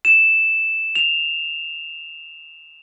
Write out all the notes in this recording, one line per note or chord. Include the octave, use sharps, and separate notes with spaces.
E7
F7